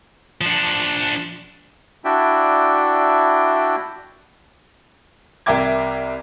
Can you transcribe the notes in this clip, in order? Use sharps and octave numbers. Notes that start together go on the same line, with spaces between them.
F3 D4
D4 E4 F#4 D5 E5 G5
C2 A#4 E5 G5 D6 G#6